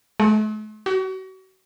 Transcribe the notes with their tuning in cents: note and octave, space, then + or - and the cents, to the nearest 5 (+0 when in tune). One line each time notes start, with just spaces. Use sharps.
A3 -45
F#4 +35